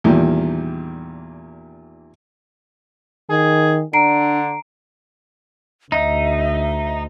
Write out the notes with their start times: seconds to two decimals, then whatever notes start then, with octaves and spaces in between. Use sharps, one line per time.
0.04 E2 A#2 D#3 G3
3.30 D#3 G#4
3.93 D3 D4 A#5 C7 D7
5.92 D2 D#4 E5